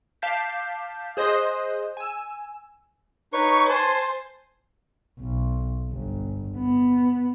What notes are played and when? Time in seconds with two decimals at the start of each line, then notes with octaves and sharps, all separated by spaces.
0.22 F5 A5 D6 G6 B6
1.17 G#4 C5 D#5 C6 D#6 F#6
1.97 G#5 E6
3.33 D#4 B4 C#5 C#6
3.69 C5 G#5 A5
5.20 B1
5.91 G1
6.57 B3